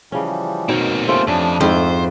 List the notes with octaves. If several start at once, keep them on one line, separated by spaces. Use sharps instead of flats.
C#3 E3 F3 G3 C#4
B2 D#3 A#3 C4 C#5
A3 C#4 F4 G4 C5
F2 F3 C#4 D4
F2 G#2 A3 E4 C5